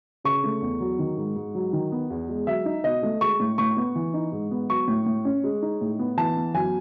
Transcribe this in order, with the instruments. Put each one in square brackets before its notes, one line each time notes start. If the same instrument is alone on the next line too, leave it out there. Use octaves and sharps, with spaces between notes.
[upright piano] C#3 C#6
A3
E2
F#3
D#3
G#2
G#2
F#3
D#3
B3
E2
G#3
F#3 E5
D#4
B2 D#5
A3
G#3 C#6
A2
A2 C#6
B3
E3
D#4
G#2
B3
F#3 C#6
A2
A2
C#4
G#3
D#4
A2
B3
E3 A5
B3
F#2 G#5